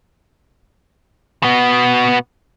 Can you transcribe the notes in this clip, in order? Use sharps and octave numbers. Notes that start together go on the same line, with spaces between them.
B2 B3